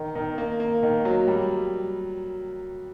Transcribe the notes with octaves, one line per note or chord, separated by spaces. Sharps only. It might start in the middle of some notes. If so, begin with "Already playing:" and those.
Already playing: D#3
D#3
A#3
A#3
D#3
F#3
G3